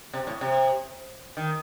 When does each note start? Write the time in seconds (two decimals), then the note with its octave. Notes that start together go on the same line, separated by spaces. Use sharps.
0.13 C3
0.27 A2
0.41 C3
1.37 D#3